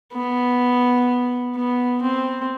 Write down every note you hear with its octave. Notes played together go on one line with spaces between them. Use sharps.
B3
B3
C4